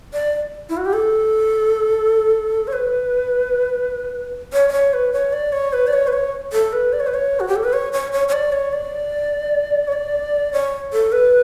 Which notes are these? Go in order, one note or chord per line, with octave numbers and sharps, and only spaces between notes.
D5
E4
F#4
G4
A4
C#5
B4
C#5
D5
C#5
B4
C#5
D5
C#5
B4
D5
C#5
B4
C#5
A4
B4
D5
C#5
B4
C#5
F#4
G4
A4
B4
C#5
C#5
C#5
C#5
D5
C#5
D5
C#5
D5
C#5
A4
B4